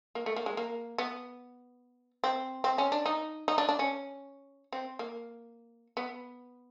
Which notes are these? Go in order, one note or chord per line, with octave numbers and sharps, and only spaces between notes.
A#3
A3
A#3
G#3
A#3
B3
C4
C4
C#4
D4
D#4
D#4
D4
D4
C#4
C4
A#3
B3